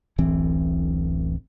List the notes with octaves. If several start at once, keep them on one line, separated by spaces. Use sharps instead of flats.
D1 A1 E3 C4